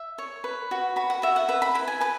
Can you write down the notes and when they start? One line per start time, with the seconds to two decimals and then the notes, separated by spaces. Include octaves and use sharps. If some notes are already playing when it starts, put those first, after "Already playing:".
Already playing: E5
0.18 C#5
0.44 B4
0.71 F#4
0.96 F#4 B5
1.10 F#5
1.22 F#4 E5
1.36 F#5
1.49 B4 E5
1.62 B5
1.75 E4 B5
1.88 G#5
2.01 B4 B5